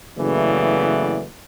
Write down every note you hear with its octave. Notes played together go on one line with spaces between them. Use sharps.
F#1 C#3 E3 A3 B3 D5